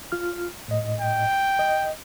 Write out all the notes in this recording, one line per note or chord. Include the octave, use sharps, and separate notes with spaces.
F4 F6
A2 D#5
G5
D#5